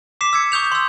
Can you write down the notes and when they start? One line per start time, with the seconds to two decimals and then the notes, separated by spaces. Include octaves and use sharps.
0.21 D6 B6 C7 E7
0.33 E6 G#6 C#7
0.52 C#6 D#6 G6 F7
0.72 C6 E6